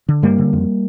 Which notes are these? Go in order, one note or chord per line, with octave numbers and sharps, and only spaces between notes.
D3
G2 G3 A#3
D3
F2